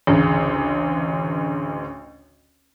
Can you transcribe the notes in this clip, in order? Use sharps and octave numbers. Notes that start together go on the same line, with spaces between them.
A1 D2 C#3